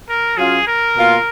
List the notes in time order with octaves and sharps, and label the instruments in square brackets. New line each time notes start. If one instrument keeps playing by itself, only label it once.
[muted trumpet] A#4
[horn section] F#3 C#4 F4 [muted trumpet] G#4
[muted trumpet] A#4
[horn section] B2 A#3 F4